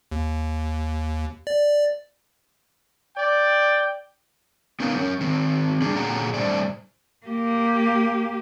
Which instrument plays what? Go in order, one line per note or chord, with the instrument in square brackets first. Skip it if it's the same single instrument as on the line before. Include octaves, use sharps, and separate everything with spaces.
[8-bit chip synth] D#2
D5
[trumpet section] D5 G5
[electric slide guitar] B3 C#4 D#4 A#4 B4 F5
F#3 C#4
D#3 C4
G3 D4 G#4
A#2 D3 F#3 G#4 F#5 A#5
A2 G3 A3 D4 C5 D5
[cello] A#3 G4